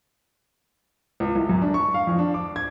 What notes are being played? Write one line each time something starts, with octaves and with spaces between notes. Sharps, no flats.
C#2
C2
F#2
D4
C#6
F5
F2
D4
D6
G#6